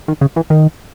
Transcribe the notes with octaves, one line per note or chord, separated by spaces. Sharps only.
D#3
C#3
E3
D#3